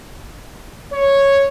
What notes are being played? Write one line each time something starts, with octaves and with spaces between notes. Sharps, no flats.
C#5